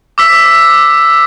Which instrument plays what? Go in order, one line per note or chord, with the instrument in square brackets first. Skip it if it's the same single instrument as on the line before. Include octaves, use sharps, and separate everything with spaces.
[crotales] D6 E6 B6